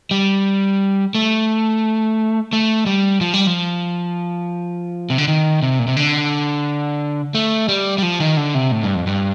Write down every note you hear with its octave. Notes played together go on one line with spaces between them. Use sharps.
G3
A3
A3
G3
F3
G3
F3
C3
D3
D#3
C3
A#2
C3
D3
A3
G3
G3
F3
D#3
D3
C3
A2
G2
F2
G2